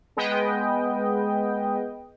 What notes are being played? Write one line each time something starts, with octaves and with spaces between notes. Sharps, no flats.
G#3 B3 B4 D#5 G5